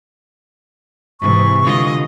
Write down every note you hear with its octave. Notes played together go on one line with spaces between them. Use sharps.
G#2 C3 E3 C#6
D3 G#3 F4 D#5